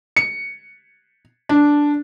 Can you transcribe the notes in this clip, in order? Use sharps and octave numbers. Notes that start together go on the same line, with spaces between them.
C#7
D4